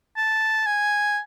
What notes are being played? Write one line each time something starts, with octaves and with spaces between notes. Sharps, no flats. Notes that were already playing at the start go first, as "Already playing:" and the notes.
A5
G#5